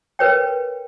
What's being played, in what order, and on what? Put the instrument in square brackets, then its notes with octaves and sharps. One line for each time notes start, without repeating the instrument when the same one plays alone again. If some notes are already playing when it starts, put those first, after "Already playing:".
[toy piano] A#4 B4 C#5 G5